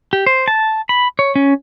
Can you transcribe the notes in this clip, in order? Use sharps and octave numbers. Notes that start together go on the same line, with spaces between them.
G4
C5
A5
B5
C#5
C#4